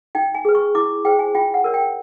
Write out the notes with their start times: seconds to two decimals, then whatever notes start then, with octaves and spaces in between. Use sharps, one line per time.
0.15 D#4 G5
0.34 G#5
0.45 G#4 B4
0.55 C#6
0.75 E4 D6
1.05 G#4 C5 G5
1.19 G#5
1.35 F4 G5
1.54 F#5
1.64 A#4 C#5
1.74 G5